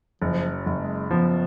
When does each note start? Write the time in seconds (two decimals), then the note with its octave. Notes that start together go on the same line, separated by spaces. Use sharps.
0.22 F#1 F3
0.51 F#3
0.66 F#1
0.81 G#3
1.10 F3 B3